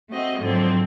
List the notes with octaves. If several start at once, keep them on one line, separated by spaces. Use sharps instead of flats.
A3 C4 F#4 D#5
G#2 D3 F3 F#3 C4